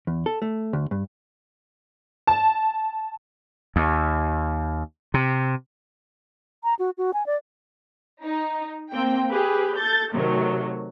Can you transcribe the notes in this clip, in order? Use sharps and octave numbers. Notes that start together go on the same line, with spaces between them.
E2
A4
A3
D2
G2
A5
D#2
C3
A#5
F#4
F#4
G#5
D5
D#4
A#3 C4 G5
G4 G#4 B4
A4 G6 A6
C3 D#3 F#3 A3